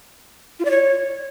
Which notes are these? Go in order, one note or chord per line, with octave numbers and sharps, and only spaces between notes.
F4
D5
C#5